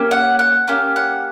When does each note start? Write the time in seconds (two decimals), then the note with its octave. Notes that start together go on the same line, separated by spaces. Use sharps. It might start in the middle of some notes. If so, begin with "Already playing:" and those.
Already playing: A#3 C#4 G4
0.11 F#5
0.39 F#5
0.68 A#3 C#4 G4
0.96 F#5